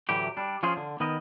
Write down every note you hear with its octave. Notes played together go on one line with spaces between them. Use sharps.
D2 A2 E3 F#3 G4
G3 D4
F3 C#4 F4 G#4 C5
D3
D#3 B3 A#4 D#5